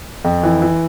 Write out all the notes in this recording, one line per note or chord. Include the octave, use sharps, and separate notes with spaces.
F2
E3
E3